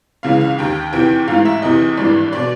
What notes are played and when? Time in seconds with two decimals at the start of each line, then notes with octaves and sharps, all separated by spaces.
0.23 C#2 C#3 E3 F5
0.41 F5
0.58 D#2 D#3 G5
0.93 E2 C3 E3 G5
1.28 A1 G#2 E3 F5
1.45 E5
1.62 E2 C3 E3 D#5
1.97 G#1 G2 E3 D5
2.33 B2 D5